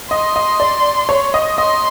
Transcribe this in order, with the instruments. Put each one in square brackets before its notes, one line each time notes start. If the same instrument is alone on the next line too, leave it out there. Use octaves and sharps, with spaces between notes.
[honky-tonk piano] D#5 [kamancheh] C6
[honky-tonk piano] D#5
D5
C#5
D#5
[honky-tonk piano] D#5 [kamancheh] C6